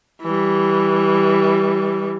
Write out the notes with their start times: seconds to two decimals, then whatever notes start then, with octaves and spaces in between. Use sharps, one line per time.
0.23 E3 G3